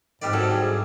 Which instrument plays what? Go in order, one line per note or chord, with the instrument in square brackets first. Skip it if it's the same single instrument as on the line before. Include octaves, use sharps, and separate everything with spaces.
[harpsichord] C2 G3 D5 [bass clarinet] G#2 [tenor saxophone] D#3
[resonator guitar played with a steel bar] F#3 [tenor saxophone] A4
[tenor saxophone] G#4